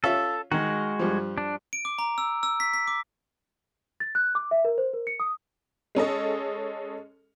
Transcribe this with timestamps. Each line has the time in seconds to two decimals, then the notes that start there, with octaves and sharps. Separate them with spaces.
0.04 C#4 F4 A4 E5
0.52 D#3 G#3 F#4
0.99 G2 F3
1.38 D4
1.73 D7
1.85 D6
1.99 A#5
2.18 E6
2.43 E6
2.60 B6
2.73 B6
2.88 D6
4.00 A6
4.15 F#6
4.35 D6
4.51 E5
4.65 A#4
4.78 C5
4.93 A#4
5.07 C#7
5.20 D#6
5.95 G#3 C#4 A4 D#5